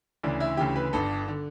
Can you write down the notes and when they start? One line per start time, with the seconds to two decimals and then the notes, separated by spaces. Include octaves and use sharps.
0.23 D2 C#3 E3 D4
0.40 E4
0.57 D2 C#3 E3 G4
0.76 B4
0.93 G1 G2 D3 A4
1.28 D3